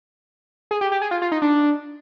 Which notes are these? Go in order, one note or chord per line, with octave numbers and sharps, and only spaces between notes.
G#4
G4
G4
G#4
F4
F4
D#4
D4